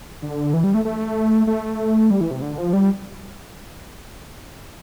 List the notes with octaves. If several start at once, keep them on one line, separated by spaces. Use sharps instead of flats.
D3
E3
G3
A3
A3
A3
G3
E3
C3
D3
F3
G3